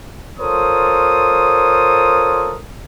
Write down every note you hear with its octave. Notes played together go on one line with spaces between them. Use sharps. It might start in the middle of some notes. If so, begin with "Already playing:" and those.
F4 A4 A#4 C5 C#5 D#6